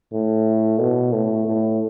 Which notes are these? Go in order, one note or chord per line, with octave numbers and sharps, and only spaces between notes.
A2
B2
A2
A2